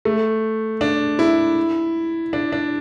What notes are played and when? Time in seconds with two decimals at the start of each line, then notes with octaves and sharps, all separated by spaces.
0.05 A3
0.81 D4
1.19 E4
2.33 D4
2.52 D4